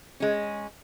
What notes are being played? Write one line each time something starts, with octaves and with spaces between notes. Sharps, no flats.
G#3 C#4